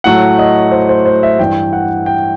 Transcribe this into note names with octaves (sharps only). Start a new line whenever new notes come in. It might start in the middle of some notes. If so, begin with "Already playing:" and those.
A2 F#3 A3 F#5
D#5
C5
C5
C5
E5
G2 E3 G3 G5
F#5
G5